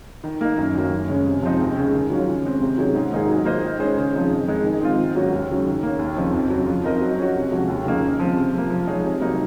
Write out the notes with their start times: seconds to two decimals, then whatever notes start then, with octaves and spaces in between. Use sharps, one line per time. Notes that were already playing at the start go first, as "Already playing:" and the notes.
0.24 D#3
0.41 A#3 D#4
0.57 F#2
0.74 D#3 F#3 A#3
0.92 F#2
1.09 C#3 G#3 C#4
1.26 C3
1.43 F3 G#3 C4 D#4
1.60 D#2
1.76 C#3 G#3
1.94 D#3
2.10 F#3 C#4 F4
2.27 C#3
2.45 G#3 C4
2.61 C3
2.78 D#3 F#3 C#4 G#4
2.94 G#2
3.12 D#3 A#3 D#4 G#4
3.29 F#3
3.45 A#3 F4 C5 D#5
3.62 D#3
3.79 G#3 C#4 G#4 C5
3.97 C#3
4.13 F3 C4 D#4 G#4
4.30 F2
4.47 D#3 G#3 D#4 G#4
4.64 D#3
4.81 G#3 C4 F4
4.98 G#2
5.15 F#3 A#3 C#4 F#4
5.32 D#2
5.49 C#3 F#3
5.66 D#3
5.83 A#3 C#4
5.99 D#2
6.16 C#3 F3 C4 D#4
6.34 F2
6.50 C#3 F#3
6.66 F3
6.84 C4 D#4 A#4 D#5
7.01 F#3
7.18 C#4 F#4
7.35 C3
7.52 F3 G#3 C#4 F#4
7.68 D#2
7.85 C#3 F3 A#3 D#4
8.02 C#3
8.19 F3 C4
8.37 C3
8.53 F3
8.58 A#3
8.70 F3
8.87 G#3 D#4 G#4 C#5
9.04 C3
9.21 F#3 A#3 D#4